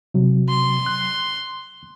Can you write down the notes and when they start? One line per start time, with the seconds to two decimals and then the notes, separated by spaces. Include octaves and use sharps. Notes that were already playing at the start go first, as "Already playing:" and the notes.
0.14 C3 F#3
0.49 C6
0.86 F#6